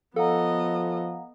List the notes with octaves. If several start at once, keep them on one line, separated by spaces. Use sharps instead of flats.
F3 B3 A4 D#5 F5 F#5 A#5